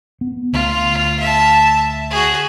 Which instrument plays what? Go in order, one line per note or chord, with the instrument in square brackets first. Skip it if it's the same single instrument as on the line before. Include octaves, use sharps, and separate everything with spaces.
[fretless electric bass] B3
[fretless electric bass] D2 [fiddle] F4
[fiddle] E5 A5
F#4 G#4